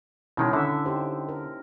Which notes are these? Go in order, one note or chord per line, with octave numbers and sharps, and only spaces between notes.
B2 D#3 G#3 C#4 E4
D3 E5
D#4 G4 C5
A#4